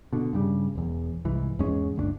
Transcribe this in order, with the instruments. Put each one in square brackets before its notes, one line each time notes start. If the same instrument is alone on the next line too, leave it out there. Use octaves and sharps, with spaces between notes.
[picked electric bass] B2 D3
G2 C#3 G3
E1 E2
C2 G#2 E3
E2 G#2 G#3 C#4
G1 D2 C#4 D4